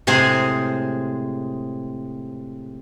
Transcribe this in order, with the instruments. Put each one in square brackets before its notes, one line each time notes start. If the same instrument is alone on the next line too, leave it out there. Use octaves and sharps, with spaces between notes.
[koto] A2 C3 G#3 G#4 C5